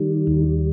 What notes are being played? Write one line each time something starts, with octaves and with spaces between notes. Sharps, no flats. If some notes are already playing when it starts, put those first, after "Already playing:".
Already playing: D#3 G3
D#2